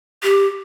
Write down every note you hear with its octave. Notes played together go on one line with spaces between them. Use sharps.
G4